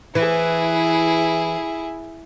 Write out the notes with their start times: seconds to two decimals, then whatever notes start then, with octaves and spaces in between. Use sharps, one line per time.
0.15 E3 E4 G#4